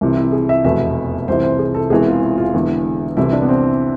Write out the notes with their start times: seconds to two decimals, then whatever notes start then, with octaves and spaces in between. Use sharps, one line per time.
0.01 C2 C3 E3
0.17 E4
0.32 G#4
0.49 E5
0.64 F1 E2 B2 E5
1.28 C2 C3 E3 C5
1.43 C5
1.59 G#4
1.74 A4
1.90 E1 E2 C3 E3 G#4
2.07 F4
2.23 F4
2.38 F4
2.54 E1 E2 D3 E4
3.17 C2 C3 E3 E4
3.33 D4
3.42 B3
3.49 C4